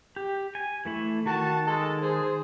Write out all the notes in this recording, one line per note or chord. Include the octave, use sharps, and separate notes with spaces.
G4
G#5
E3 A3 E4
D#3 F#4 A5
G#3 A4 A5
G#4 C5